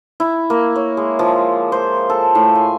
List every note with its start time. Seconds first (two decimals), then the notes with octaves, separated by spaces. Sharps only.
0.20 E4
0.50 A#3
0.76 C#5
0.97 G#3
1.19 F3
1.72 C5
2.10 A4
2.35 A2
2.55 G#5